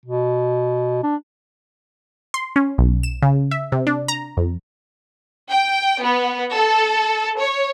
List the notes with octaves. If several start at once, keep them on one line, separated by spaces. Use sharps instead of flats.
B2
D4
C6
C#4
B1
E7
C#3
E5
C3
D4
A#5
F2
G5
B3
A4
C#5